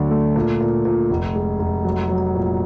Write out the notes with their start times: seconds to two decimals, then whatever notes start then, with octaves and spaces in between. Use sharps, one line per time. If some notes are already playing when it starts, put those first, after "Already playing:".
Already playing: D2 D3 F#3
0.11 A3
0.36 A#2
0.60 A#2
0.85 A#2
1.10 F1
1.35 G#3
1.59 F1
1.84 F#3
2.09 F#3
2.34 A#2